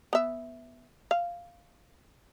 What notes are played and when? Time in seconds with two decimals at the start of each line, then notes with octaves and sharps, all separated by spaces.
0.13 B3 E5
1.11 F5